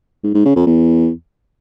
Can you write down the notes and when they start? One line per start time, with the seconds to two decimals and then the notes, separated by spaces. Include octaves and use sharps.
0.24 G#2
0.35 G#2
0.45 C#3
0.56 F2
0.67 E2